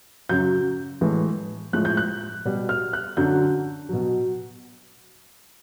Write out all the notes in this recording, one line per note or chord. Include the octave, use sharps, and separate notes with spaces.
F#2 C#3 F#3 G6
A2 E3 G#3
A2 F3 G#3 F#6
G6
F#6
B2 G3
F6
F#6
F#2 D3 F#3 G6
B2 F#3